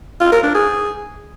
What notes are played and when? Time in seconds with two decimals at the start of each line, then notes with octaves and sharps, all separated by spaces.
0.20 F4
0.32 A#4
0.43 D4
0.55 G#4